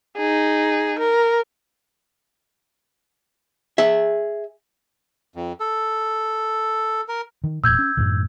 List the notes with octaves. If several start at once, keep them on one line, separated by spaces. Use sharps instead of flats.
D#4 G#4
A#4
G#4 E5
F2
A4
A#4
D#3
E1 A#2 E6 G6 G#6
C#4
F#2 A2 D#3